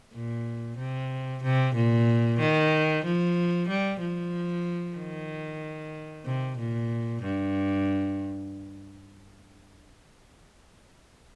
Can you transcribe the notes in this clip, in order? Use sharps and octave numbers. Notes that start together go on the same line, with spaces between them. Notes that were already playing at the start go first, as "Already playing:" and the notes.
A#2
C3
C3
A#2
D#3
F3
G3
F3
D#3
C3
A#2
G2